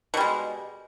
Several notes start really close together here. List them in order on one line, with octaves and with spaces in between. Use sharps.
B2 G3 G#3